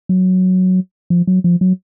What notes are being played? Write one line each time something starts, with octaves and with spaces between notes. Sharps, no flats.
F#3
F3
F#3
F3
F#3